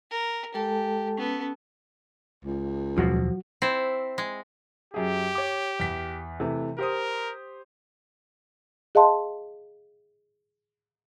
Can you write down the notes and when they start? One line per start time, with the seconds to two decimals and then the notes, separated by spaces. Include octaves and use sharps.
0.11 A#4
0.54 G#3 G4 A4 A5
1.17 B3 C#4 A4
2.45 C#2
2.98 D#2 B2 F3 F#3 F#4
3.62 C4 E4
4.18 G#3
4.94 F#2 G4 G#4
5.35 C#5 D6
5.80 E2 B6
6.40 C3 E3 A3
6.79 G4 A#4 C5 D#6
8.95 G#4 D#5 F5 A5 C6